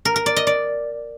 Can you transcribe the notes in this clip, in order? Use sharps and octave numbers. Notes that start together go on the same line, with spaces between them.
A#4
A#4
D5
D#5
D5